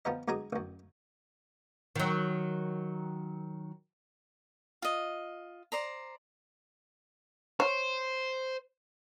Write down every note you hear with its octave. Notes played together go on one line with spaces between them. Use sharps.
F3 G3 B3 A#4 D#5
G2 F#3 G#3 G#4 A#5 D#6
A1 F#2
D#3 F#3
F4 D#5
C5 D5 A#5
C5 C#5